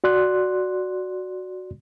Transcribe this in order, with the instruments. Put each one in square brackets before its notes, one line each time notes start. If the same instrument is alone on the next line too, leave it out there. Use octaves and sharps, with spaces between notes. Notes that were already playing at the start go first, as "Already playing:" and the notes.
[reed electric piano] F#4 D5 C6 F#6